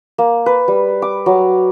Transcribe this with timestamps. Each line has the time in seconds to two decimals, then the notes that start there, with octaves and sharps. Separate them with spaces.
0.18 A#3
0.46 B4
0.68 G3
1.02 D6
1.26 F#3